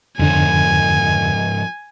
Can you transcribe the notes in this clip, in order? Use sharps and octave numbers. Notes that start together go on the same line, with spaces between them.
F2 G#2 D3 F3 G#5